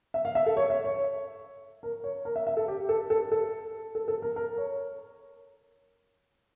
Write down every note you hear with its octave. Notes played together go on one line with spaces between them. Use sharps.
E5
F5
E5
A4
C#5
E5
C#5
A#4
C#5
A#4
E5
E5
A4
G4
A4
A4
A4
A4
A4
A#4
A#4
C#5